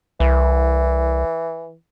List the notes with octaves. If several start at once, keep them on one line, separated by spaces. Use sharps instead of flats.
C2 E3